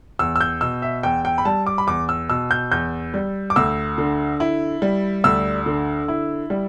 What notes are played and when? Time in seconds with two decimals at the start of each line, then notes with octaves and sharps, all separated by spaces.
0.19 E2 E6
0.36 E6
0.41 G6
0.61 B2 E6
0.82 E5
1.03 E2 G5
1.25 G5
1.38 B5
1.45 G3 A5
1.67 D6
1.78 B5
1.87 E2 D6
2.09 E6
2.30 B2 E6
2.51 G6
2.72 E2 G6
3.14 G3
3.50 D6
3.56 D2 E6
3.98 D3
4.40 E4
4.82 G3
5.24 D2 E6
5.66 D3
6.08 E4
6.50 G3